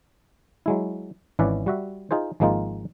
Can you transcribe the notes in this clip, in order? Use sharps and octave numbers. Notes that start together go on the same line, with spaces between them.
F#3 G#3 E4
G#1 E3 C#4 B4 D5 E5
G3 F#4 E5
D#4 F4 G#4 C5
G#1 F3 G#3 A#3 D#4 F4